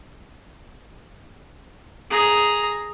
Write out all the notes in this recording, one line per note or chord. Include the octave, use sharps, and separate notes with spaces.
G#4 A#5